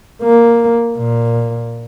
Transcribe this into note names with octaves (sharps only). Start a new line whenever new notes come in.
A#3
A#2